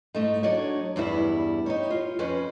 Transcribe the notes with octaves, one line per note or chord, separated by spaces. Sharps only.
G#2 A3 D#4
F#3 D4 D#4 C#5
E2 G2 G3 E4
D#4 G4 C#5
F4
F2 C#4 B4 C5